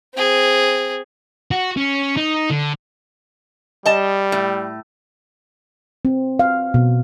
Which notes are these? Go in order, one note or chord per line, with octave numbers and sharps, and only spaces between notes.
C4 G#4
F#4
C#4
D#4
D3
G3 D#5 A5
A2
C4
F5
B2